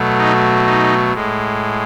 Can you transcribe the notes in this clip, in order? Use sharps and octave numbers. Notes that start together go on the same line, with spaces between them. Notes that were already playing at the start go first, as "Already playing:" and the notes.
Already playing: B2 F#3 A3
D#4
D#4
A2 G#3